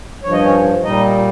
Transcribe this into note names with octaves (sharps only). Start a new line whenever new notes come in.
G2 F3 C#5
D#5
C#4 C#5
A#2 G3 D#4 D#5